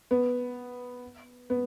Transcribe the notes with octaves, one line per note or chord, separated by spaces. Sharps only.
B3
B3